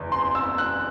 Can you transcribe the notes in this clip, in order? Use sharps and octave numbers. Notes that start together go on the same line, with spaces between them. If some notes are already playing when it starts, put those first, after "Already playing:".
Already playing: F#1 E2
C6
E6
F#6